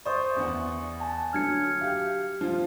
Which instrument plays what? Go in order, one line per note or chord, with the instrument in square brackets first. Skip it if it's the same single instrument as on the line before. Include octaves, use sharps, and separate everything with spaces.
[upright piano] C5 [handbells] D5 C#6 D#6
[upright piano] E2 B3 F#5
[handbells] G#5 A5
[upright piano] D3 F#3 [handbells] F6 G#6 C#7
[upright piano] G4 F5
F3 F4